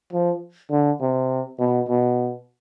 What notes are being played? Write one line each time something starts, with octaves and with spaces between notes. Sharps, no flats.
F3
D3
C3
B2
B2